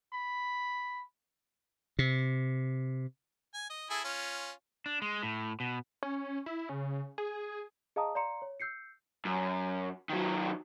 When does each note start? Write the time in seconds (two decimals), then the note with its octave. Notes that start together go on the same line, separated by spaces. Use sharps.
0.13 B5
1.99 C3
3.54 G#5
3.70 D#5
3.90 E4 G#4 A4
4.05 C#4 F4
4.86 D4
5.02 G#3
5.23 A2
5.60 B2
6.03 C#4
6.46 E4
6.69 C#3
7.18 G#4
7.96 G#4 D#5 F5 A5 A#5 D#6
8.15 D5 F5 A#5 C6 C#7
8.42 C#5
8.60 E6 G6 C7 C#7
9.25 F#2
10.10 D#3 F#3